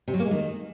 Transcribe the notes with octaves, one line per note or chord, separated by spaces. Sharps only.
C3
F#3
A#3
G#3
D#3